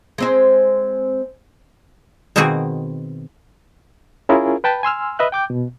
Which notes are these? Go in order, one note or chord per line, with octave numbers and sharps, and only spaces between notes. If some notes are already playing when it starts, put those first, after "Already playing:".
G#3 C4 C5
B2 D#3 A#3 C4 F#4 G#4
C#4 E4 F4 G#4 A#4
B4 G5 A5 B5
G#5 C6 E6 F6
B4 D#5 E5 F#6
G5 D6 G6
B2